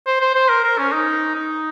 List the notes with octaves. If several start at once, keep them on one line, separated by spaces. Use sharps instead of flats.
C5
C5
C5
A#4
A#4
C#4
D#4
D#4